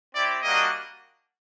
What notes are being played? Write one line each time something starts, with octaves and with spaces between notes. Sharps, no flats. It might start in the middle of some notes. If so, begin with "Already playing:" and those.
C4 E4 G4 D5
G3 A#3 D4 F#4 D#5